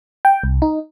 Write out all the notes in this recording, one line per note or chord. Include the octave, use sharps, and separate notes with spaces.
G5
C2
D#4